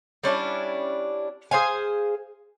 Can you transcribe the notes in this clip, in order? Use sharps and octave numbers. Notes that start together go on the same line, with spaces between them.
G3 C#4 D4 E4
G#4 C5 F5 G#5